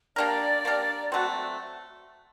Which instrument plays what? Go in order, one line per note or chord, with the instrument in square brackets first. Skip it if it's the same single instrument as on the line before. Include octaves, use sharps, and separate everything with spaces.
[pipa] A#3 D4 G4 A#4 [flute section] D5
[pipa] A#3 D4 G4 A#4
[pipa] F#3 A3 C4 [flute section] F#4